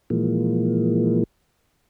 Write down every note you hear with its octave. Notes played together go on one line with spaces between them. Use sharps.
A#2 E3 F3 G#3 A#3